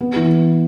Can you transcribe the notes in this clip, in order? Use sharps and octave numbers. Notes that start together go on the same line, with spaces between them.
B3
E3